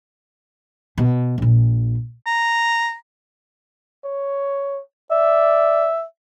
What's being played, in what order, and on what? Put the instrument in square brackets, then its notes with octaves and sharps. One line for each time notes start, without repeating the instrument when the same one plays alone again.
[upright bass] B2
A#1 A#2
[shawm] A#5
[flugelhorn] C#5
[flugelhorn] D5 [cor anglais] E5